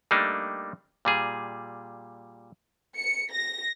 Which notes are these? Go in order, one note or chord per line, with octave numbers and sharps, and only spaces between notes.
G3 A3 A#3 D4 D#4
A#2 G3 G#4
C#7
A#6